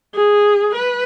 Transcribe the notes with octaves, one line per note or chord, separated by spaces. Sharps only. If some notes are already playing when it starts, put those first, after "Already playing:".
G#4
B4